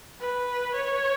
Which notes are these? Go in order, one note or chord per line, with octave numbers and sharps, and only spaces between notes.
B4
C#5